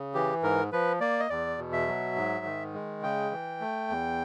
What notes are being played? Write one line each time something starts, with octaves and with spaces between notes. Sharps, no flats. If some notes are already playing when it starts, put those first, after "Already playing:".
Already playing: C#3
E3 G4
G#2 A#4
F3 B4
A#3 D5
D#5
E2 D5
B2
E5
F#3
G#2
D#3
G#3
C#3 G5
E3
A3
E2